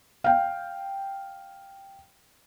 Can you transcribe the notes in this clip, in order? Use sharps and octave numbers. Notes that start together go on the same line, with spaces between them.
F5 G5